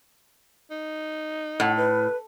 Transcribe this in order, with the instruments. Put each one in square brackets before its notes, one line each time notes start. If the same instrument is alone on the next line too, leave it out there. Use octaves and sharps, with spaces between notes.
[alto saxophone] D#4
[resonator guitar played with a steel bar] A2 [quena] F#5
[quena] B4